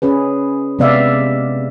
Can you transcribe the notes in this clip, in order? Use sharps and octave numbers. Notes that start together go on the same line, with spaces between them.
C#4 G#4 B4
C3 G#3 B3 D5 E5 F5